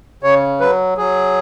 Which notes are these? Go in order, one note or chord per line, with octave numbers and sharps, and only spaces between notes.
C#3 C#5
F#3 B4
F#3 G#4